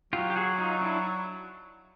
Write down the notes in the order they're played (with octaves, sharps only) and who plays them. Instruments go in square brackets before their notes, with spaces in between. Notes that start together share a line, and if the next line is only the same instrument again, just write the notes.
[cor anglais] F#3 [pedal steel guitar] F4 G4
[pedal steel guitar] G4
F#4 G#4
D#4 F4
D4 E4